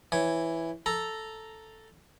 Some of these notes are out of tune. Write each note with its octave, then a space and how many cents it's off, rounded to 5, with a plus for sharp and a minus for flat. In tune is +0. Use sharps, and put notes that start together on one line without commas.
E3 +0 C#5 -5
A4 +0 A#5 +0